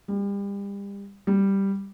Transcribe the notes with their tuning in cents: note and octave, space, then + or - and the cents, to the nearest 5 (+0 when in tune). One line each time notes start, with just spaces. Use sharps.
G3 +35
G3 +0